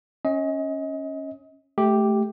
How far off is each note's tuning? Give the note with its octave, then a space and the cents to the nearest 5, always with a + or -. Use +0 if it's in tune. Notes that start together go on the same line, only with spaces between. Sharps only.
C#4 -10 D#5 +30
A3 -15 G4 +0